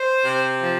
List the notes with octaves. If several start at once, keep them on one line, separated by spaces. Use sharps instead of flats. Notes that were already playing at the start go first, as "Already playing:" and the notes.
Already playing: C5
C3
F3